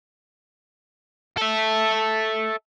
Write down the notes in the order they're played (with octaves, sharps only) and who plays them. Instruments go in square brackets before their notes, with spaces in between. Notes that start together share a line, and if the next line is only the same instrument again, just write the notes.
[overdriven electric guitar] A4 E5